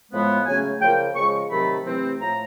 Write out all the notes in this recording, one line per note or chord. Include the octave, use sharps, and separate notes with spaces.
A2 F3 G#3 B3
C#3 F#3 A3 C#4 G#5
C#3 F3 A#3 G5
C#3 F3 G#3 C#6
C3 D#3 F#3 A3 B5
C3 E3 A3 C4
A2 F3 A3 A#5